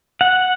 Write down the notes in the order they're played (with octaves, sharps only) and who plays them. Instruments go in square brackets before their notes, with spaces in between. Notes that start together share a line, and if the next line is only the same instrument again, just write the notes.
[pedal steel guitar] F#5